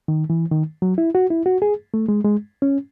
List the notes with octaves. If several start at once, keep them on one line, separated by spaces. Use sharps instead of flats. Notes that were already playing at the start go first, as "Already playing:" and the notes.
D#3
E3
D#3
F#3
E4
F#4
E4
F#4
G#4
A3
G#3
G#3
C#4